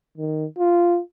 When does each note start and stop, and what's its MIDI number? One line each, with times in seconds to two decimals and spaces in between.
0.18 0.46 51
0.58 1.00 65